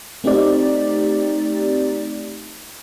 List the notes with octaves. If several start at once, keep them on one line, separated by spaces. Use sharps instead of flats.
A3 C4 D#4 G4 D5